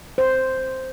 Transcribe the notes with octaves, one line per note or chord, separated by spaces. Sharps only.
C5